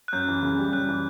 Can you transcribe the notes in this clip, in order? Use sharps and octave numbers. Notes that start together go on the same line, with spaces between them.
F#6
F#2 G6
E3
C#3
G3
F#2 F#6
E3